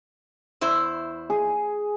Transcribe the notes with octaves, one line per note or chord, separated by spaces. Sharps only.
E2 E4 C5
G#4